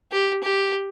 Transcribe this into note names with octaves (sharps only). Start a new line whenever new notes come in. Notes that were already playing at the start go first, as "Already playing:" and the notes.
G4
G4